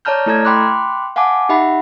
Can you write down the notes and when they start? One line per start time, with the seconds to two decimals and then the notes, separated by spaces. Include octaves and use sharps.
0.05 C#5 D5 A5 A#5 F6 G6
0.26 A3 E4 A4 A#5 F6 G#6
0.45 G5 B5 C6 D6 F#6
1.16 F5 F#5 G#5 A5 D6
1.49 D#4 G4 E5 F#5 B5